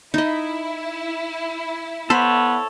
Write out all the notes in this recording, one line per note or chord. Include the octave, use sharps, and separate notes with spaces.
D#4 E4 D#5
B3 A4 C5 C#5 B5